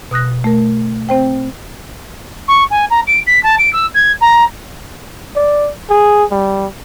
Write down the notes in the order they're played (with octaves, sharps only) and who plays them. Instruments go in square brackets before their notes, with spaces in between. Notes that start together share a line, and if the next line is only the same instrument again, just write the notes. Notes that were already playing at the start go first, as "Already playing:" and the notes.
[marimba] B2 D#6 F#6 A#6
A3 A#4
C4 C5 G5
[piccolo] C#6
G#5
A#5
D7
B6
A5
D7
E6
G#6
A#5
[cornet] D5
G#4
G3